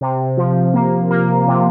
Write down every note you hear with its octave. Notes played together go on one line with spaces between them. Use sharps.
C3
F3
A#3
A#3
C3